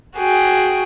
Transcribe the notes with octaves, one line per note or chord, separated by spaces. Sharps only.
F#4 G#4 G5